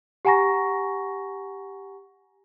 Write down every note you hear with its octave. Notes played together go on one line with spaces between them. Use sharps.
G4 F#5 G#5 A#5 C#6 A#6